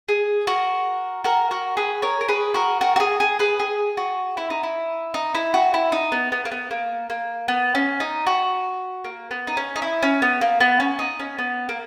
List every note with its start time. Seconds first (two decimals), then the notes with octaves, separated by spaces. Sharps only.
0.09 G#4
0.47 F#4 A#4
1.24 F#4 A#4
1.51 F#4 A#4
1.77 G#4 B4
2.02 A#4 C#5
2.21 A#4
2.28 G#4 B4
2.54 F#4 A#4
2.81 F#4 A#4
2.96 F#4
3.00 G#4
3.20 G#4
3.39 G#4 B4
3.59 G#4
3.97 F#4
4.37 E4
4.50 D#4
4.63 E4
5.14 D#4
5.35 E4
5.54 F#4
5.74 E4
5.92 D#4
6.12 B3
6.32 B3
6.45 A#3
6.52 B3
6.71 A#3
7.10 A#3
7.48 B3
7.75 C#4
8.00 D#4
8.27 F#4
9.04 A#3
9.31 B3
9.47 D#4
9.57 C#4
9.76 D#4
9.82 E4
10.03 C#4
10.22 B3
10.41 A#3
10.60 B3
10.80 C#4
10.99 D#4
11.20 C#4
11.39 B3
11.69 A#3